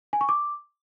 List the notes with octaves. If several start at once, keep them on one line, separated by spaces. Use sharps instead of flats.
G#5
C#6
D6